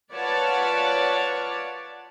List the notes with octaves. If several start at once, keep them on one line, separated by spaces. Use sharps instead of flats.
F4 B4 C#5 D5 F#5 A5